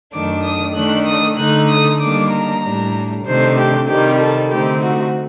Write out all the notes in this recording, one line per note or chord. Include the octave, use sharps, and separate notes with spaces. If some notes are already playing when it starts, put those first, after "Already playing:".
F#2 D#3 A3 D4 D6
D#6
D#3 A3 D4 F#6
D#6
D3 A3 D#4 F#6
D#6
D#3 G3 A#3 D4 D6
A#5
A2 G3 D4
C3 D#3 A3 D4 C5
G4
C3 D#3 G3 G4
A4
D3 A3 C4 D#4 G4
F#4